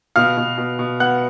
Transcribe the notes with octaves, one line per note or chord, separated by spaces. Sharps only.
B2 F5 F6
B2
B2
B2
B3 F#5 F#6